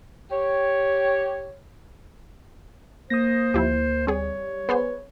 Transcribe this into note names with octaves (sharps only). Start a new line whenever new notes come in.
G4 C#5
A#3 C5 D#6 A#6
D2 F3 E4 G4
G3 C4 G#4 C#5
B3 G#4 B4 C5